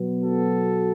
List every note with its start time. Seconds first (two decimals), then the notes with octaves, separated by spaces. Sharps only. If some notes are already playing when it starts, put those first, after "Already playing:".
Already playing: B2 F#3 B3
0.22 F#4 A4